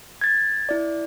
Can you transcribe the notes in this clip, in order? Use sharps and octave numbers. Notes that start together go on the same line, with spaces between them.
G#6 A6
E4 D5